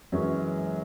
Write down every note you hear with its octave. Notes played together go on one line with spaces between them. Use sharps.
F#2 E3 G#3 C#4 F#4